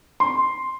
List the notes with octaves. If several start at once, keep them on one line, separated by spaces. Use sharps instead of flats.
C6